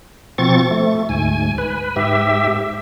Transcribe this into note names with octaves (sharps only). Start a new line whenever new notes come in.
B2 F3 C4 C#6 A6
A3
D2 G#2 G#5
B4
G#2 G4 E5